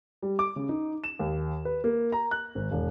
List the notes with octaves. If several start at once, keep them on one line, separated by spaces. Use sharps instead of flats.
G3
D6
C#3
D#4
E7
D#2
B4
A#3
A#5
F#6
G#1
E1